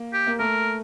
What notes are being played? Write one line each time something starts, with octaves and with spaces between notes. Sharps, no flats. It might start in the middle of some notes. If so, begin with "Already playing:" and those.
Already playing: A#3
G4
A#3
A3 A#4